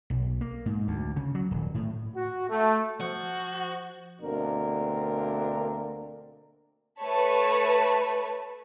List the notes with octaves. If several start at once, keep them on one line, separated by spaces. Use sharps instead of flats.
B1
A#3
G#2
D2
C#3
F#3
D#1
A2
F#4
A3
F3 F#4
D2 B2 A#3 C4 D4 A#4
A3 B4 C#5 A5 B5